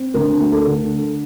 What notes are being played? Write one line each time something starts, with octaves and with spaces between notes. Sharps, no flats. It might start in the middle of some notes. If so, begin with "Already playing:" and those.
Already playing: C4
D2 A#4
A3
A4
D3